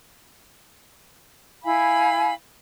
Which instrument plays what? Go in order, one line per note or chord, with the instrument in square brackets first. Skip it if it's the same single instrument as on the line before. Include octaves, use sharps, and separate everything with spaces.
[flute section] E4 F5 G#5 B5